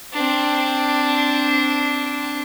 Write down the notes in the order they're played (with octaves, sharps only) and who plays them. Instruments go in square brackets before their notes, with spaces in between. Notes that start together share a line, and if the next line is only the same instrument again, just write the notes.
[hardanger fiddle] C4 D4